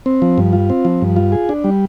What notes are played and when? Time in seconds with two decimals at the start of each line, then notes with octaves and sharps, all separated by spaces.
0.06 C4
0.22 F3
0.38 G2
0.53 F4
0.70 C4
0.85 F3
1.02 G2
1.16 F4
1.32 G#4
1.49 D4
1.64 G3